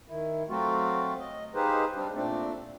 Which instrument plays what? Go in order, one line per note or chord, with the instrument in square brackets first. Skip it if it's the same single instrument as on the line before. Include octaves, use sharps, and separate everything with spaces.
[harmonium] D#3 E4
F#3 A3 C4 F4 F#4
D#5
D#4 F4 G4 G#4 B4 C5
G3 C4 D4
A#2 A3 C4 D4